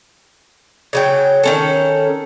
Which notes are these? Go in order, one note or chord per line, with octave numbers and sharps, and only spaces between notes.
C#3 F#3 G5
D#3 C#4 A4